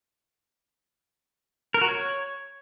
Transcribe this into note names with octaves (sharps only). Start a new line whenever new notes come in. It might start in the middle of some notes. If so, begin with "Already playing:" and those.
A#4
F#4
C#5